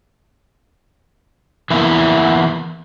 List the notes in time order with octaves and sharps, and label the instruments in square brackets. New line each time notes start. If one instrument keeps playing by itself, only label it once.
[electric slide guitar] E3 A#3 B3 E4